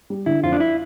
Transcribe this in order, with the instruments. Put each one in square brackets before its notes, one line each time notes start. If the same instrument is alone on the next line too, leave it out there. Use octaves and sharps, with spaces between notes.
[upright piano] G3
[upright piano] D3 [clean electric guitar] E4
[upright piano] F2 [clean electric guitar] F4
[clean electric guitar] D4
E4